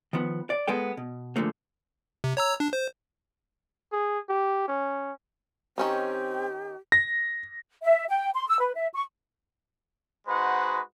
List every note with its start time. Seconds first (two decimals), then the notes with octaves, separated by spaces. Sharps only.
0.13 D#3 F3 B3
0.50 D5
0.68 G#3 B3 A4 G5
0.97 B2
1.36 G#2 D3 F3 A3 A#3
2.24 C3
2.37 C#5 A#5 E6
2.60 D4
2.73 C5
3.92 G#4
4.29 G4
4.68 C#4
5.78 D#3 C4 C#4 D#4 G4
6.92 A#6
7.83 E5
8.09 G5
8.34 C6
8.48 E6
8.60 B4
8.76 E5
8.93 C#6
10.28 G#3 D#4 F#4 B4 C5 F#5